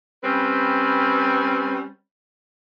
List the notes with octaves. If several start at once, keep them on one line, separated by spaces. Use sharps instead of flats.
G3 C4 C#4 B4